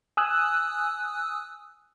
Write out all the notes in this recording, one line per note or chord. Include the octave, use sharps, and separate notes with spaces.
G#5 D#6 E6 F#6